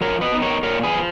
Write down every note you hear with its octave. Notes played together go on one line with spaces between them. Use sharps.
F3 A#4 C#5
B4 D#5
B3 D#4
A#4 C#5
A#2 A#4 C#5
G#4 B4
F3